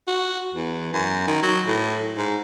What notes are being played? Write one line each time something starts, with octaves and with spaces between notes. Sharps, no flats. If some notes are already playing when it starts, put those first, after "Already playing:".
F#4
E2
F#2
D#3
F#3
A2
G#2